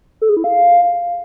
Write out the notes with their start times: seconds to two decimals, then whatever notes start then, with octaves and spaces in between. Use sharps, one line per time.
0.22 A4
0.29 G#4
0.37 E4
0.44 F5